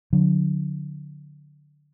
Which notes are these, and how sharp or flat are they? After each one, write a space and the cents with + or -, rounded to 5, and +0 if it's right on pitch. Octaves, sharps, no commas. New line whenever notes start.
D3 +0 F#3 -35